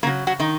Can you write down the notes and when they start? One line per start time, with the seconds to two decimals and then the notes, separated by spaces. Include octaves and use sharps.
0.03 C#3 F#3 A#3 A#4
0.27 F#3 F#4
0.39 D#3 D#4